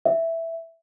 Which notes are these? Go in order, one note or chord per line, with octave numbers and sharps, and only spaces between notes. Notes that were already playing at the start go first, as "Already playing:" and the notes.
E5